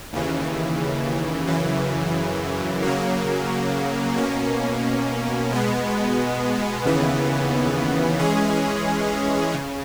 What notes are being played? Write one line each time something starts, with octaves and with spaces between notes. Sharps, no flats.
D#2 C#3 E3
F#2 C#3 E3
C#3 F#3 A#3
B2 A#3 C#4
B2 G#3 B3
D#2 C#3 E3 B3
E3 G#3 C#4 G#4
C#3